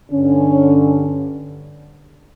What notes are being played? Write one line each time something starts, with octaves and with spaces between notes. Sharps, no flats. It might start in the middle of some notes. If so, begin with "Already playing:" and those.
G2 D3 C#4